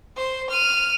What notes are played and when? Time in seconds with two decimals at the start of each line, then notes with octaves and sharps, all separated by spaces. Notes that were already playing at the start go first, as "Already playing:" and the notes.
0.16 C5
0.49 F6 D#7